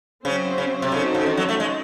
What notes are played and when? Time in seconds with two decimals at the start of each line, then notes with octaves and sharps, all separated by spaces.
0.25 C#3 F#3 C4 E4 C5
0.58 C#3
0.82 C3
0.92 C#3 C4 D#4 F#4 A4 C5
1.14 C#3
1.26 D#3
1.37 F#3
1.49 A3
1.60 G#3